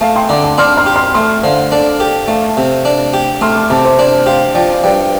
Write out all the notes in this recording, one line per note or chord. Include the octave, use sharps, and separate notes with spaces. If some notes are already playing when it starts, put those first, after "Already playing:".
A3 F5 A5
G5 C6
D3 A5 D6
A5 D6
D4 C6 F6
C6 F6
G4
C6 F6
A3 C6 F6
D3 C5 F5
D4 A4 D5
G4 A4
A3 F5 A5
C3
D4
G4
A3 C6 F6
F6
A5 D6
C3 A5 D6
C5
D4 C5
G4 C5 F5
F3 D5 G5
G2 D5 G5